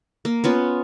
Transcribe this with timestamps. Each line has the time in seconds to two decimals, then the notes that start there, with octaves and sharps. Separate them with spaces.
0.25 A#3
0.44 B3 C#4 F4